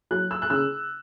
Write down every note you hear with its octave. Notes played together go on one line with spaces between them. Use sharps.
F#3 F#6
E6
F#6
C#3 E6